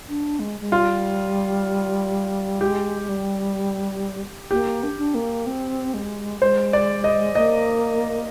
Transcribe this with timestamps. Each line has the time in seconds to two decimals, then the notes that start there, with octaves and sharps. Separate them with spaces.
0.09 D4
0.39 G#3
0.61 G#3
0.71 G3 F4
2.61 G#3 G4
3.09 G3
4.51 A#3 G4
4.83 D4
4.98 D4
5.15 A#3
5.46 C4
5.94 G#3
6.41 G#3 C5
6.73 D5
7.04 D#5
7.35 A#3 D#5